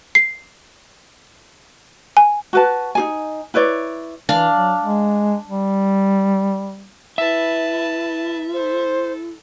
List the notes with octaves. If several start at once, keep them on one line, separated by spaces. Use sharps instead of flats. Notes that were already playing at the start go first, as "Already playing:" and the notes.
C7
G#5
F#4 B4 A5
D#4 G#4 G#5
E4 B4 C#5 D5
E3 D4 F5
F#3
G#3
G3
E4 B4 E5 A5
A4 C5